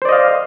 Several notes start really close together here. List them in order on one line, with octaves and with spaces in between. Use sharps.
C5 D5 D#5 F5